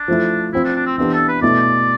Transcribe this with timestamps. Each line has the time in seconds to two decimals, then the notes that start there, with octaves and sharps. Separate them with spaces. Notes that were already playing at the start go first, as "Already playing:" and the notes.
Already playing: D4
0.08 F3 A3 E4
0.53 F3 C4 E4 F4
0.65 D4
0.76 D4
0.86 C4
0.98 E3 B3 C4 D4 G4 B4
1.13 A4
1.28 B4
1.42 B2 A3 E4 D5